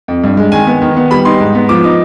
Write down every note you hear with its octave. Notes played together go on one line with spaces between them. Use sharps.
F2
G2
G#3
D#3 G#5
B3
D#3
B3
G3 B5
D#4 C6
G#2
B3
F3 D6
D#4